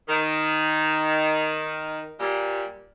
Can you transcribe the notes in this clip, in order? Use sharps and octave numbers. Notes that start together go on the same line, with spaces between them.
D#3
A#2 G3